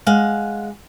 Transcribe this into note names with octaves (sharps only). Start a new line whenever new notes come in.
G#3 F5 F#5